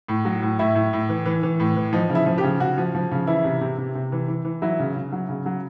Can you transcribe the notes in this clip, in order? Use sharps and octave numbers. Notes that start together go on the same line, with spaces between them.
A2
F#3
A2
A2 E4
A2
A2
E3
E3
E3
A2
E3
F3 D#4
C#3
E4
F3
G4
C#3
C#3 F#4
F3
F3
C#3
E3 E4
C3
C3
C3
C3
E3
E3
E3
F#3 E4
C#3
C#3
F#3
C#3
F#3